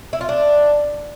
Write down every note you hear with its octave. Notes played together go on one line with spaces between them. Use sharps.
E4
F4
D4